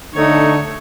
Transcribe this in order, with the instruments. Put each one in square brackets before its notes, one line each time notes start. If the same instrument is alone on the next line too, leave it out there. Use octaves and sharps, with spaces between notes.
[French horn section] D3 [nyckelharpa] A3 C#5 [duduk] D#4